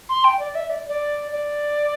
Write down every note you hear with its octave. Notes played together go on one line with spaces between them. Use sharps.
C6
G5
D5
E5
D5
D5
D5